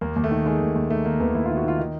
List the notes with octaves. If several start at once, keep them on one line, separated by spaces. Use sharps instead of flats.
D#2 A#3
D#2
A3
D#3
D#3 G#3
D#2
D#2
D#3 A3
D#3 A#3
D#2 B3
D#2 E4
D#3 F4
F#4
D#3 F4
D#3